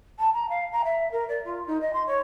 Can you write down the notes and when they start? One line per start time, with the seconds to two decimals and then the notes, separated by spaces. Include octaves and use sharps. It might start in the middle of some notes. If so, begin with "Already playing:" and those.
0.19 A5
0.33 A#5
0.49 F5
0.72 A#5
0.85 E5
1.12 A#4
1.29 D5
1.45 F4
1.67 D#4
1.81 D#5
1.93 C6
2.07 C#5